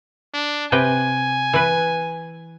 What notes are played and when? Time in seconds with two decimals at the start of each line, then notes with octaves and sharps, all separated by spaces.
0.34 D4
0.72 C3 B4 G5 G#5
1.53 E3 B4